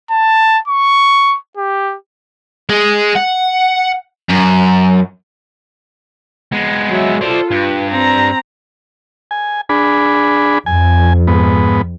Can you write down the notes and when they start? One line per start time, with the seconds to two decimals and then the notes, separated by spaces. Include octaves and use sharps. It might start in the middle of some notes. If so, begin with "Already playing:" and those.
0.11 A5
0.68 C#6
1.57 G4
2.69 G#3
3.16 F#5
4.29 F#2
6.52 G#3 B3
6.88 F#3 E5
7.21 F4 A4 C5 D5
7.51 G2 B4
7.91 C4 A#5
9.31 G#5
9.69 D4 G#4 B5
10.66 F2 G#5
11.28 G#2 B3